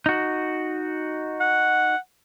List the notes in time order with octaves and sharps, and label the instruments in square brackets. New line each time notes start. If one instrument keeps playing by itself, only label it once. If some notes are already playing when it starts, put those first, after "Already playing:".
[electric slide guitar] D#4 F#4
[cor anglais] F#5